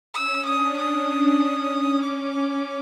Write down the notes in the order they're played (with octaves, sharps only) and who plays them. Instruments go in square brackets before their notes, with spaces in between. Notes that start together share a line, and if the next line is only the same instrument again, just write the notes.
[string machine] C#4 [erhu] E6
[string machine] D4 [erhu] D#6
[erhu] D#6
[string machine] C#4
[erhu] D6